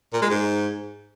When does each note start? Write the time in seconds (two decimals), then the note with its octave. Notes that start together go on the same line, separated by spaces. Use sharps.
0.13 A#2
0.22 G#3
0.30 G#2